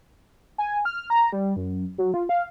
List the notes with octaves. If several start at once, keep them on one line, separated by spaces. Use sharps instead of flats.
G#5
F6
A#5
G3
F#2
F#3
F4
F5